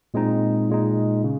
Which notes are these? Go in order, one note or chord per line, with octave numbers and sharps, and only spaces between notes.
A#2 G#3 C4 D#4
A#2 G#3 D#4
C#3